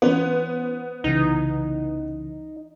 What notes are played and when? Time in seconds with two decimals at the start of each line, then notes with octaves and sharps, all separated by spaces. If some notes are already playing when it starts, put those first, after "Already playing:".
0.02 E3 B3 C#4 C5
1.04 C2 C#3 E3 D#4